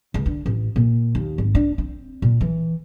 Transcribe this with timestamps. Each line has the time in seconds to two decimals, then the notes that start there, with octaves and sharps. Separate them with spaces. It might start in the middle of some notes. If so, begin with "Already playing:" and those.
0.14 C#2
0.26 D3
0.46 A1
0.76 A#2
1.15 D#2
1.38 G#1
1.55 D4
1.78 C4
2.22 A#2
2.41 E3